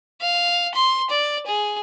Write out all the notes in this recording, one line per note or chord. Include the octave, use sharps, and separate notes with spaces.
F5
C6
D5
G#4